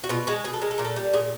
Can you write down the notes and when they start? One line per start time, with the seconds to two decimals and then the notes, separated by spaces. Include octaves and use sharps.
0.04 F#4
0.09 B2 F4
0.27 G#3 F#4
0.44 B2 G#4
0.53 A4
0.62 G#3 A#4
0.71 A4
0.78 A#2 A#4
0.85 A4
0.96 G3
1.13 A#2 G#4